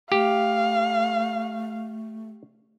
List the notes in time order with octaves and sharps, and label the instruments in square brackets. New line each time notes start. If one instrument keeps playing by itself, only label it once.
[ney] A3 [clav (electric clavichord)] G4 [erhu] F5